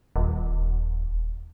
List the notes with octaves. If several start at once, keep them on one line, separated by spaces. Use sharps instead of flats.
D#1